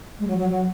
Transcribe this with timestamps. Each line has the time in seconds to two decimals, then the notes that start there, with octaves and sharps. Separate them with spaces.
0.20 G#3
0.27 F#3
0.38 F#3
0.49 F#3